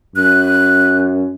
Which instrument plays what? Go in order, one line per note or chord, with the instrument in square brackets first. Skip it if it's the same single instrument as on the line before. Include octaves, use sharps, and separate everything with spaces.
[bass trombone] F#2 [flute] F#6